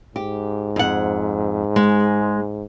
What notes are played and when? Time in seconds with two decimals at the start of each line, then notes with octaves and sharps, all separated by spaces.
0.16 G#2 G4
0.76 F2 F#5
1.76 G#3